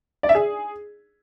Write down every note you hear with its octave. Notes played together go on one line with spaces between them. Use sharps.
D5
E5
G#4